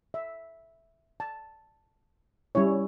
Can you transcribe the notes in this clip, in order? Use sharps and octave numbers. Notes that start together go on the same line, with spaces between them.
E5
A5
G3 C#4 E4 C#5